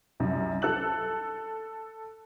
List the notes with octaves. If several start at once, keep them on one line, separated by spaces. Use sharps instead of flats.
C2 F#2
A4 E6 F#6 F#7